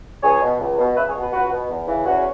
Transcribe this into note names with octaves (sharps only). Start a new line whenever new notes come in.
C#2 G#4 C#5
B2
C#2
B2
C#2 B4 E5
G#4 C#5
B2
F#4 B4
C#2 F#4 B4
B2
E2
C#3 E3
E2 C#4 F#4